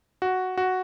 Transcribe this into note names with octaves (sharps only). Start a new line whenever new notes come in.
F#4
F#4